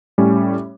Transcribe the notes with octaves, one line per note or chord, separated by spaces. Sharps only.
A2 G3 C#4